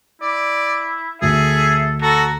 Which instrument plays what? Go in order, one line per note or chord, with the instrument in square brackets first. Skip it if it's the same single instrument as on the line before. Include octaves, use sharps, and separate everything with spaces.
[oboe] E4 [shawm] D5
[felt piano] D2 [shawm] G#4 [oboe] A4 [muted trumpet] E5
[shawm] F#4 [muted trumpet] A4 [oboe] A#5